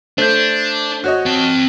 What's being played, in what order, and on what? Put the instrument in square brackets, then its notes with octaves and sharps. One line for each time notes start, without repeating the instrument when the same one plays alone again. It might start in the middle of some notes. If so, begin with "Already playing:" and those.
[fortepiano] A3 [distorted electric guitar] D4 [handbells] C5 G6
[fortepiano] F#4 C#5 D#5
[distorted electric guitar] C4 A5